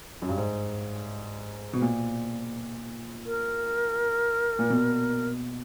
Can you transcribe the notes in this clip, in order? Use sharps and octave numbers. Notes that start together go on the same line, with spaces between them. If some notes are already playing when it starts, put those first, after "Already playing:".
F#2
G2
G#2
B2
A#2
A#4
A#2
B2